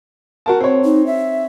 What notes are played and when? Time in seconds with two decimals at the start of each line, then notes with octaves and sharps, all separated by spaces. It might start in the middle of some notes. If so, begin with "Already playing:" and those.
0.46 F#4 A#4 A5
0.60 C4 C#5
0.85 D#4
1.07 E5